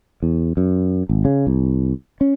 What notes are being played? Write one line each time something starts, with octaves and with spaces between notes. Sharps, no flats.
E2
F#2
G#1
C#3
C2
C#4